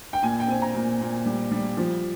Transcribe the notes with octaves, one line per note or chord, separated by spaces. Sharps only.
G5
A#2 G#5
G5
C4 G#5
A#5
A#2
A#2
G3
G3
F3